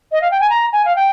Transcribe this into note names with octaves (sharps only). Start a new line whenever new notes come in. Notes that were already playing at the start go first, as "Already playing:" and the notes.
D#5
F5
G5
G#5
A#5
G#5
F5
G5